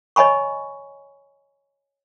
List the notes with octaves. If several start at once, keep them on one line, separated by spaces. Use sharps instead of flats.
C#5 D#5 G#5 B5 C#6